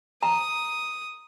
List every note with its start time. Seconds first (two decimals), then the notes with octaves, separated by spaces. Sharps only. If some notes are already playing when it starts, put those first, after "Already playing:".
0.23 A#5 D#6